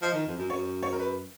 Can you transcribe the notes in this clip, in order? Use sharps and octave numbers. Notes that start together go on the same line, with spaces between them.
F3 D#5
D#3
F2
F#2
F#2 C#5
C#5
A#4
B4